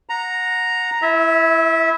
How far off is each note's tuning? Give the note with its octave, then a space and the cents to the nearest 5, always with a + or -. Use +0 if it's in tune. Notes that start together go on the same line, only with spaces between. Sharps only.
F#5 -20 A#5 +0
E4 +10 E5 -25